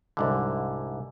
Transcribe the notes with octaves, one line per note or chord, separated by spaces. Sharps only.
C2 G#2 D3